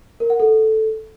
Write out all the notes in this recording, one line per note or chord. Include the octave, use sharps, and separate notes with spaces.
A#4
F#5
A4